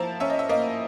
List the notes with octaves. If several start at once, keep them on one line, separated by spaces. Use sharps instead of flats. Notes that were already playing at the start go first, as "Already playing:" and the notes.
Already playing: F3 A#3 E4 A5 A#5
C#4 E5
D#5
E5
A#3 D#5